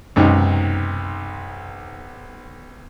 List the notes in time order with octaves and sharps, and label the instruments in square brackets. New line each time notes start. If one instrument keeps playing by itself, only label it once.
[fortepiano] B1 C3 D#3 [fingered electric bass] F#2 G#3 C#4